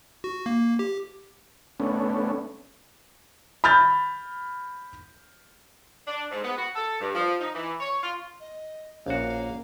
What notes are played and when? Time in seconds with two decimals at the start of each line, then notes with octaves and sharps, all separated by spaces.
0.24 F#4
0.46 A#3
0.79 G4
1.80 A3 B3 C#4 D4
3.64 B5 F6 G6 A6
6.08 D4
6.32 G#2
6.44 B3
6.57 F#4
6.75 A4
7.01 G2
7.15 F3
7.40 D#4
7.55 E3
7.80 C#5
8.04 F4
8.40 D#5
9.06 A#1 A#3 C#4 F#4 F5